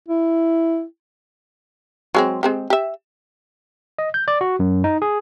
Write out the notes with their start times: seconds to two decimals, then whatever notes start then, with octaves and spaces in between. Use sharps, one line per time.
0.09 E4
2.15 F#3 G#3 C4
2.43 G#3 C4 G4
2.70 G4 E5
3.99 D#5
4.14 G6
4.28 D5
4.41 F#4
4.60 F#2
4.84 D#4
5.02 G#4